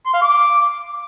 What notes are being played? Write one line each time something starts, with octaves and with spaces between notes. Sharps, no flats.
C6
F5
D6